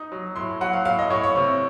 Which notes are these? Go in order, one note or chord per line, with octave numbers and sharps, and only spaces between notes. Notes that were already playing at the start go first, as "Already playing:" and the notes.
Already playing: D#4 D#6
F#3
A2 C6
F#3 F#5
F5
A2 F5
D#5
A2 C#5
C#5
C3